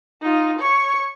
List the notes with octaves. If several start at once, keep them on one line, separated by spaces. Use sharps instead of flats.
D#4 F4
C#5 C#6